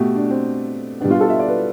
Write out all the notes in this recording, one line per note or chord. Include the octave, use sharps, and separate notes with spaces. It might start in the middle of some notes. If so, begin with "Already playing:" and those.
Already playing: B2 A3 G4
D4
C4
B2 G3 B3 D4
F4
A4
E5
D5
B4